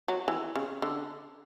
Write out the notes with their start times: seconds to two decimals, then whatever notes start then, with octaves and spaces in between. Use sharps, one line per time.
0.08 F#3
0.28 E3
0.56 C#3
0.82 D3